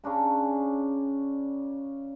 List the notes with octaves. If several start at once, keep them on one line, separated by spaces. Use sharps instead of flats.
C#3 C#4 D4 A#5